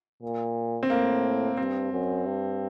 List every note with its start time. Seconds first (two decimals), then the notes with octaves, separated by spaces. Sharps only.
0.22 A#2
0.83 C4
0.90 A2 A#3
1.57 G2 C4
1.92 F#2
2.26 G2